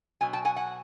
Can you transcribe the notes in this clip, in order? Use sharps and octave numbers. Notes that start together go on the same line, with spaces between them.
B2 F#3 G#5
G5 A5
F#5 G#5
F#5 G#5